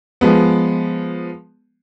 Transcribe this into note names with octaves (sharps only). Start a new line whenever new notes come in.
F3 G#3 B3